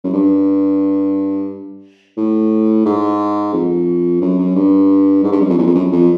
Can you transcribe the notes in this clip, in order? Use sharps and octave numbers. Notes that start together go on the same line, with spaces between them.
F#2
G2
A2
G#2
F2
F#2
F#2
G2
G#2
G2
F#2
F2
E2
F2
F#2
F2